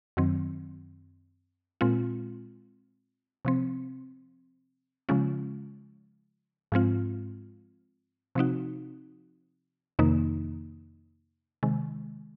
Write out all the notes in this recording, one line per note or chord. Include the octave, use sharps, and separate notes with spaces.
F#2 D#3 F#3 C4
A#2 G#3 C4 F4
C3 F3 C4
C#3 F3 G#3 C#4 F4
G#2 F3 G#3 C4 F4
C3 F3 C4 D#4 F#4
F2 C3 D#3 A#3 D#4
C3 D#3 G#3